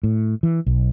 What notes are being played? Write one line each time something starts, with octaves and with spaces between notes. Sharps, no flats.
A2
E3
B1